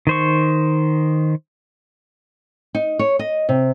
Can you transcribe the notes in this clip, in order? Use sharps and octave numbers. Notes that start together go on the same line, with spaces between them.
D#3 C5 C#6
D#4
C#5
D#5
C3